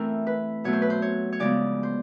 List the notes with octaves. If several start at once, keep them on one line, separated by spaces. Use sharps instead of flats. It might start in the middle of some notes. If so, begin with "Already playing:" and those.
Already playing: E3 A3 C4 A#4
B4
B2 F#3 A3 C#5
C5
B4
C5
C#5
C#5
C#3 F3 G#3 B3 D5
C5